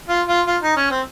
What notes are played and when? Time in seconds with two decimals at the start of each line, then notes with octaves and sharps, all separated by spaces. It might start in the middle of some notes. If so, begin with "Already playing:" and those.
0.09 F4
0.28 F4
0.47 F4
0.62 D#4
0.77 C#4
0.91 C4